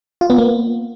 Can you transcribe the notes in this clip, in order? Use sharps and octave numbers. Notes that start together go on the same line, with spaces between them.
F4
B3
A#3